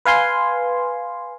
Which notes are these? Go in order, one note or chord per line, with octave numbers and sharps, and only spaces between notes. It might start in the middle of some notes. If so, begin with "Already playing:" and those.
B4 F5 G#5 C6